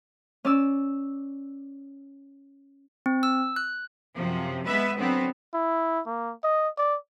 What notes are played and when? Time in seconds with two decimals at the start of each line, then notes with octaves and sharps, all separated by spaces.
0.45 C#4 D5 E6
3.06 C4
3.23 E6
3.56 F#6
4.15 F#2 C3 F3
4.65 G#3 B3 B4 E5
4.98 D3 F#3 B3 C4
5.54 E4
6.06 A#3
6.44 D#5
6.77 D5